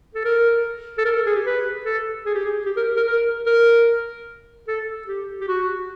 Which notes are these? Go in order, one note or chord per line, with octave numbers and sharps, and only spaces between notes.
A4
A#4
A4
A#4
A4
G#4
G4
B4
A4
G#4
G4
G#4
G4
A#4
A#4
A#4
A#4
A4
G4
G4
F#4